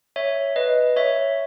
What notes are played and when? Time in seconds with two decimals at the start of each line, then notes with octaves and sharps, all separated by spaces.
0.16 C#5 E5
0.56 B4 D#5
0.96 C#5 E5